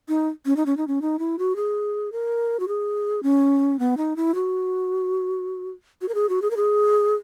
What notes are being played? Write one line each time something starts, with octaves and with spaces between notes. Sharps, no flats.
D#4
C#4
D#4
C#4
D#4
C#4
D#4
E4
F#4
G#4
A#4
F#4
G#4
C#4
B3
D#4
E4
F#4
F#4
A#4
G#4
F#4
G#4
A#4
G#4